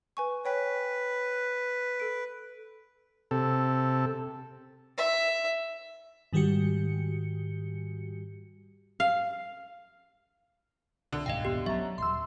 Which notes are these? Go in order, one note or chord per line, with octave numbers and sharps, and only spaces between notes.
B4 G#5 C#6
B4 C#5 G5 B6
A4 D7
C3 A4
E5
G#2 D#3 G3 F#4 G4 C#7
F5
C2 D3
D#1 B1 G#2 D#5 F5 G5
B3 G4
F#3 C#4 E5 A#5
D#1 C6 E6